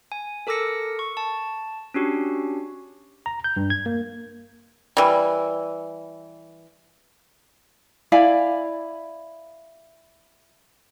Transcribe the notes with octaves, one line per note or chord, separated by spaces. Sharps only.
G#5
A4 A#4 D6 E6 A#6 C#7
C#6
A5
C#4 D4 F#4 G4
A#5
G6
G2
G#6
A#3
E3 G3
E4 D5 F5 G#5